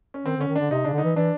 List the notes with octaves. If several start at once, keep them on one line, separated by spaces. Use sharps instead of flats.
C#4
D#3 C4
D3 C#4
D#3
D3 D4
C3 D#4
C#3 D4
D3 D#4
E3
E3 D4